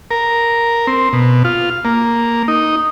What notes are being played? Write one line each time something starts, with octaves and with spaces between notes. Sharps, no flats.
A#4
C4
B2
F4
A#3
D#4